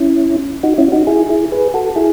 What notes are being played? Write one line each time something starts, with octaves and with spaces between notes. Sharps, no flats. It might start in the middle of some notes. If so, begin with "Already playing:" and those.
Already playing: C#4 E4
D#4 F#4
C#4 E4
D#4 F#4
E4 G#4
E4 G#4
G#4 B4
F#4 A4
E4 G#4